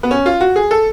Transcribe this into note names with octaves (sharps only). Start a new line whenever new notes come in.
B3
C#4
F4
F#4
G#4
A4